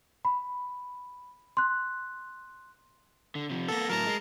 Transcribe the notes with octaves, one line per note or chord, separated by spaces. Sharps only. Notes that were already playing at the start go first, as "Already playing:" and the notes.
B5
C6 F#6
D3
C3 F3
A#3 B3 A4 A#6
A2 F#3 A#4 A5 A#5
G#3